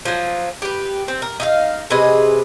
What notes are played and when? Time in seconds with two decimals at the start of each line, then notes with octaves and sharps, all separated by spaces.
0.05 F3 F#3
0.62 G4 B4
1.08 C4
1.22 A#4
1.40 D#4 E5 F5
1.90 C3 G#4 B4 D#5